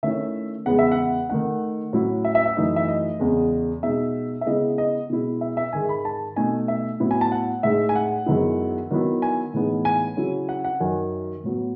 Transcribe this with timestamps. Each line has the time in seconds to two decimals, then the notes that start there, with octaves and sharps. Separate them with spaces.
0.03 D#3 A3 C#4 E4 E5
0.66 E2 C#3 G#3 B3 F#5
0.79 E5
0.92 F#5
1.30 D#3 A3 D#4 F#5
1.93 A2 F#3 C#4 E4
2.25 E5
2.35 E5
2.46 E5
2.57 F#2 E3 A3 D#4
2.76 E5
2.88 D#5
3.20 E2 C#3 G#3
3.83 B2 G#3 D#4 E5
4.41 E5
4.46 C#3 G#3 B3 E4 D#5
4.78 D#5
5.10 B2 G#3 B3 E4
5.41 E5
5.57 E5
5.73 G#2 D#3 G#3 G#5
5.89 B5
6.05 A5
6.36 B2 A3 D#4 G#5
6.68 E5
7.00 A2 F#3 B3 E4
7.11 G#5
7.21 A5
7.32 F#5
7.63 A2 G#3 D#4 E5
7.89 G#5
7.96 F#5
8.26 F#2 D#3 G#3 B3 E4
8.90 D#3 F#3 B3 E4
9.22 G#5
9.54 A2 E3 G#3 B3 D#4
9.85 G#5
10.17 C#3 F#3 C#4 E4
10.49 F#5
10.64 F#5
10.80 F#2 D#3 F#3 G#5
11.44 A2 F#3 B3